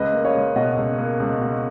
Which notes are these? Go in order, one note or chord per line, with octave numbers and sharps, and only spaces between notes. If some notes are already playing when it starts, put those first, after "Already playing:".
Already playing: C#2 B4 D#5
A#3
C#5 F5
C#2
B2 D#5 F#5
C#2
A#3
C#2
B2